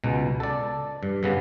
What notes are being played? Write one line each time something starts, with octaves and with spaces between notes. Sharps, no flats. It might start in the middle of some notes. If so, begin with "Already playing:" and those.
C#2 B2
A4 D5
G2
G2 C#3 B3